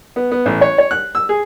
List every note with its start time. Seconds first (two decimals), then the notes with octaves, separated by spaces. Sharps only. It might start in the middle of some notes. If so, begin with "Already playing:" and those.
0.16 B3
0.31 B3
0.46 A1
0.61 C#5
0.78 C#5
0.91 F#6
1.15 E6
1.29 G#4